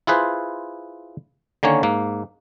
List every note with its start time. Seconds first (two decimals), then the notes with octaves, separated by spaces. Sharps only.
0.07 E4 F4 G#4 B4 C5
1.63 D3 D#3 A#3 C#4 C#5
1.83 G#2 A#3